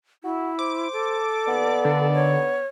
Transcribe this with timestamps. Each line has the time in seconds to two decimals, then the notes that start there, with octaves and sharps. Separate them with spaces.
0.24 E4 F#4
0.59 C5 D6
0.93 A4
1.47 D#2 B3 D5
1.85 D3
2.14 C#5